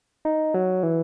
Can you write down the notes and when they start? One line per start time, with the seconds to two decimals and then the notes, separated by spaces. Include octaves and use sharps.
0.25 D#4
0.54 F#3
0.83 E3